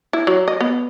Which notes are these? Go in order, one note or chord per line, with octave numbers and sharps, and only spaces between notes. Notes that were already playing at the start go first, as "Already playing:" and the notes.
E4
F#3
D#5
B3